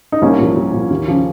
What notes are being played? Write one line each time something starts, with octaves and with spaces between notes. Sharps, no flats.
D#4
C2 A#3 C#4
A#2 F3
C2
A#2 F3
D#2
C#3 F3